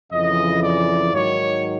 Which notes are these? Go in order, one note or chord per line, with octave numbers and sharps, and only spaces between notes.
F2 C#3 E3 D#5
D5
G#2 D#3 F#3 C#5